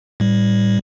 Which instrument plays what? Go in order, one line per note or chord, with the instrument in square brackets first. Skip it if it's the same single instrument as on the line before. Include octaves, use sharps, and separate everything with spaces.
[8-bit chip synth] A2 G3